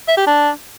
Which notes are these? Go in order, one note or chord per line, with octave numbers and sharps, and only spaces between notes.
E5
G4
D4